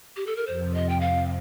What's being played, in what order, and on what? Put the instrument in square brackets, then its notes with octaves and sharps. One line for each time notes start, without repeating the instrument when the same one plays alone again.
[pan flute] G4
A4
A#4
[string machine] F2 C3 F3 [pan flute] C5
[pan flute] D#5
G5
F5